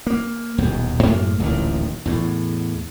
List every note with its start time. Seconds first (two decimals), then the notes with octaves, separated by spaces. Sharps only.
0.07 A#3
0.58 D#1 B1 E2
1.03 F#2 A2 G#3 A#3
1.38 D1 A1 A#2 D#3
2.05 E2 A2